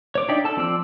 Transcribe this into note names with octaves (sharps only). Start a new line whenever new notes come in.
C#5 D6
D4 D#4 D5 E5 G5
A4 A5 E6
F3 C4 D5 E6